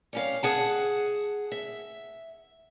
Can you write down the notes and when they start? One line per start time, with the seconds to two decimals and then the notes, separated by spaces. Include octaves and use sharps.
0.13 G3 C#4 F5
0.43 G#4 F#5 A5
1.52 E5